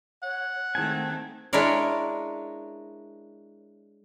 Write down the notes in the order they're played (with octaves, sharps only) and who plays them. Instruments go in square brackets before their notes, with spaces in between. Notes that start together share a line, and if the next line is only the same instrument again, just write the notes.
[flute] C#5 [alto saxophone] F#5
[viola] D#3 A3 [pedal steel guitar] C4 G#5 [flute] A5
[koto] G#3 D4 E4 A#4 C#5 D5